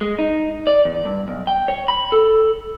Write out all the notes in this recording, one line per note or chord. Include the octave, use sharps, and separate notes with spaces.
G#3
D#4
D5
E2
G2
B1
G5
C#5
B5
A4